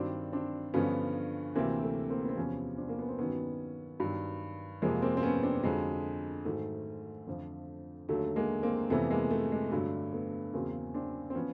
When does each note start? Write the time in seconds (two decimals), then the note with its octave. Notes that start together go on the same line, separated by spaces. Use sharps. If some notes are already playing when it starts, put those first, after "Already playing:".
Already playing: G2 D#3 F#3 C4 D4
0.33 C4 D4
0.74 G2 D3 F3 B3 C#4
1.55 D2 C3 E3 A#3 C4
1.82 A3
2.10 A#3 C4
2.21 B3
2.29 C4
2.37 E2 C3 F3 B3 C#4
2.78 C4 D4
2.89 A#3
2.99 B3
3.09 C4
3.19 G2 D#3 F#3 B3 C#4
4.00 G2 D#3 F#3
4.82 F2 C3 F3 G#3 A#3
5.02 A#3 C4
5.17 C4
5.23 B3 C#4
5.43 C4 D4
5.63 F2 D3 F#3 G#3
6.45 G#2 D#3 F#3 A3
7.27 F2 D3 F3
8.09 D#2 D3 F#3 A3
8.36 G#3 A#3
8.63 A#3 C4
8.90 F2 C3 E3 A3 B3
9.10 G#3 A#3
9.31 A3
9.52 G#3
9.71 G2 D3 F#3 A3
10.13 A3 B3
10.53 E2 C#3 F#3 A#3 C4
10.94 C4 D4
11.30 C4
11.35 F3 B3 C#4